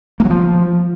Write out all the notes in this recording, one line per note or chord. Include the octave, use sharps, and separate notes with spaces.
A#3
F#3
F3